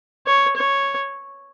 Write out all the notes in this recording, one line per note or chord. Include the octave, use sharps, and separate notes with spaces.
C#5
C#5